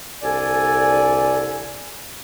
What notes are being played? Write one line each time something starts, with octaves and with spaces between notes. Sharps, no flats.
C2 D3 A4 D5 G#5